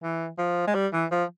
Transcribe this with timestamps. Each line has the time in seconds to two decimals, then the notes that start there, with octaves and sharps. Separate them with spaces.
0.03 E3
0.38 F3
0.67 G#3
0.74 G3
0.93 E3
1.11 F3